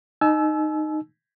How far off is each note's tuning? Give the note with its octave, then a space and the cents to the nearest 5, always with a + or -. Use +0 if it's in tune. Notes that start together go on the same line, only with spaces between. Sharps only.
D#4 -15 G#5 +45 E6 +0